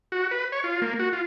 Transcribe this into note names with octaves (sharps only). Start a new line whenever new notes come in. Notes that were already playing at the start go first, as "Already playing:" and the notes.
F#4
B4
C#5
F4
A#3
F#4
F4